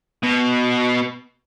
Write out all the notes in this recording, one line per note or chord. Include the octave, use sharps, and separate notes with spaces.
B2